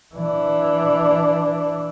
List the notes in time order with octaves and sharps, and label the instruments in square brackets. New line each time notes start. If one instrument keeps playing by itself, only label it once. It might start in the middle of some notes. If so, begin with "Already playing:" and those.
[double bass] E3 D4